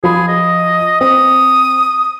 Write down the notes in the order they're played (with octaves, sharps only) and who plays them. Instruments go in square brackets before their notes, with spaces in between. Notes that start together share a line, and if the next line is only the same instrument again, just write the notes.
[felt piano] F3 B5 [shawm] G#4
[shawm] D#5
[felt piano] C4 [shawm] D#6